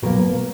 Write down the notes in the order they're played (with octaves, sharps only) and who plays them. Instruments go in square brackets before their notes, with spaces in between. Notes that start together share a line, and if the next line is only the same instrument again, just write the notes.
[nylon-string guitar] B2 F#3 A#3 A#4